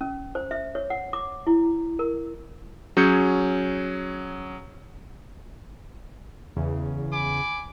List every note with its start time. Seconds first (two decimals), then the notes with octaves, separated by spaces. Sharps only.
0.01 C#4
0.35 C5
0.51 E5
0.75 C#5
0.90 F#5
1.13 D6
1.47 E4
1.99 A#4
2.97 F#3 C#4 G#4 G6 C#7
6.56 E2 C#3
7.12 G#5 B5 D6